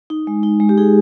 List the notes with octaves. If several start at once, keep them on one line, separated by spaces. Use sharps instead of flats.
D#4
G#3
D#4
G#3
G4
D#4 G#4